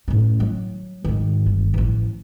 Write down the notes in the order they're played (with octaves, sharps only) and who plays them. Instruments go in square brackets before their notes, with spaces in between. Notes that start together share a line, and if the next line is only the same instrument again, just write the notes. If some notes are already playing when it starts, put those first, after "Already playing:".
[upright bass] A2 C#4
F#3
G#2 D#3
G1
A1 F3